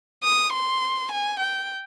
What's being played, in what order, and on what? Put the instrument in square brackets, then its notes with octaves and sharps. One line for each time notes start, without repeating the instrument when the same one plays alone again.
[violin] D#6
C6
G#5
G5